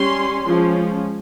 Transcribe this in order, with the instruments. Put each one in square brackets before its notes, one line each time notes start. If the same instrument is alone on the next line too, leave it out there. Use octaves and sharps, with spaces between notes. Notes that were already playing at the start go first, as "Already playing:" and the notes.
Already playing: [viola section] G3 C#4 C6
F3 G#3 C#4